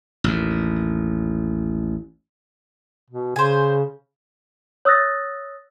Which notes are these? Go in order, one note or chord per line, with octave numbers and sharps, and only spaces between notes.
A1 D#2
B2
C#3 C5 G#5
C#5 D#6 E6 F#6 A6 A#6